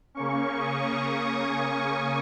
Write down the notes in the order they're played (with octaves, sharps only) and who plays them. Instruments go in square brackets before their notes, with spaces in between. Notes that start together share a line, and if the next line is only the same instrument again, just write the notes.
[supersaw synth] C#3 A#3 C#4 C#6
D#6
C#6
G#5